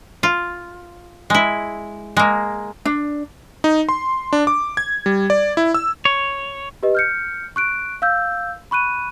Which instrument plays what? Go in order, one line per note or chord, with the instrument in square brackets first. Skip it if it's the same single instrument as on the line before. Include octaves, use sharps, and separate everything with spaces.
[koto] F4
G#3 E4
G#3 A#3
[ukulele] D4
[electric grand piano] D#4
C6
D4
D6
G#6
G3
D5
E4
E6
[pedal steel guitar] C#5
[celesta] G4 B4 D#5
F6 G6 C#7
C#6 F#6 D7
F5 E6 G6
B5 C#6 F#6 D#7